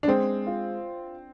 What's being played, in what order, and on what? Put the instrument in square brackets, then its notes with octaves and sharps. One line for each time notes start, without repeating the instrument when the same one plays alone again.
[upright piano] D4
[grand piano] G#3 [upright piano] C4
[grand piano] F4